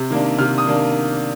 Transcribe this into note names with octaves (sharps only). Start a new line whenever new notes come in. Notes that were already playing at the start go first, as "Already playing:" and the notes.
Already playing: C3
D#3 A#3 D4
C3 F6
D#6
D#3 A#3 D4